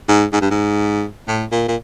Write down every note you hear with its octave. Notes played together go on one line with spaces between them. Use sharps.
G#2
G#2
G2
G#2
A2
A#2
A#2